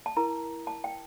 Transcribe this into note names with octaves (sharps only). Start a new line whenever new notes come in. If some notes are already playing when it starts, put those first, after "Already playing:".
A5
E4 A#4 A#5
A5
G5